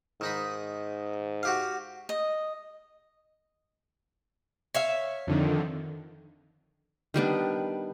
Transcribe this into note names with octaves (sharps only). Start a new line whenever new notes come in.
G#2 D#3 D#4 B5
F#4 G4 F5
D#5
C#5 E5 F5
F2 D3 D#3
D#3 G3 B3 D4